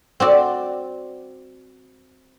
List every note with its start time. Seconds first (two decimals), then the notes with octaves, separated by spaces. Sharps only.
0.20 C4 F#4 D5